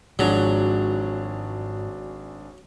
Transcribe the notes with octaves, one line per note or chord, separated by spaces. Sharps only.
G#1 G#2 F3 F#3 D4 G#4